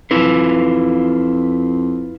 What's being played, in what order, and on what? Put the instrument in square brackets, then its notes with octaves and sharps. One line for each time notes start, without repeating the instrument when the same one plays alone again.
[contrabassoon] F2 [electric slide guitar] E4 F4 B4